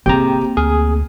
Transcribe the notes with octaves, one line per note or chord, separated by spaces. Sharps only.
C3 A#3 C4 G4 G#4 G5 A#5
D2 G#4 F6